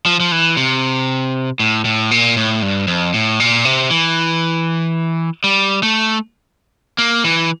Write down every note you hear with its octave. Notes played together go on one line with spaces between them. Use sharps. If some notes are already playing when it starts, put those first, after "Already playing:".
F3
F3
E3
C3
A2
A2
A#2
A2
G2
F2
A2
A#2
C3
E3
G3
A3
A#3
E3